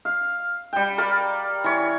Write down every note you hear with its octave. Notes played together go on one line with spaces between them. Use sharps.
F5
G3 G5
A#4 D5 F5 B5
E3 C#5